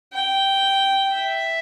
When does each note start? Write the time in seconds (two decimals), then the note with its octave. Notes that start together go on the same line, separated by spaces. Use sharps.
0.13 G5
1.13 E5